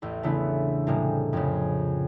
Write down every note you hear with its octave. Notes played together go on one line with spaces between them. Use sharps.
A1 E2
C#3 E3 A3 B3 D4 E4
A2 C3 G3 G#3 A#3
F2 C#3